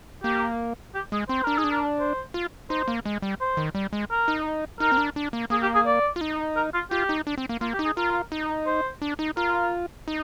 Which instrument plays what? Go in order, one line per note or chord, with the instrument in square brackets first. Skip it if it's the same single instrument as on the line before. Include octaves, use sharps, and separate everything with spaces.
[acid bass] A#3 [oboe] G4
[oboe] G4
[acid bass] G#3 [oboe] G#4
[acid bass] C4 [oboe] C5
[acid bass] D4 [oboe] A#4
[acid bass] D#4 [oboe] G#4
[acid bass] D4
[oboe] A#4
C5
[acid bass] F4
[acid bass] D#4 [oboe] C5
[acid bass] A#3
G#3
G3
[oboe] C5
[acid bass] D#3
G3
G#3
[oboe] A#4
[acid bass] D#4
[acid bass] D#4 [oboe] A#4
[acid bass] C4
D4
D4
A#3
[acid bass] A#3 [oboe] G#4
[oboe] G4
G#4
D5
[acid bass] F4
D#4
[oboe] A#4
F4
[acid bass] F4 [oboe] G4
[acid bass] D#4
D4
C4
A#3
[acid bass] A#3 [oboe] F4
[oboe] G4
[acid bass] D#4
[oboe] G#4
[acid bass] F4 [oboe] A#4
[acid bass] D#4
[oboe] C5
[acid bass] D4
D#4
[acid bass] F4 [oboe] A#4
[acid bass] D#4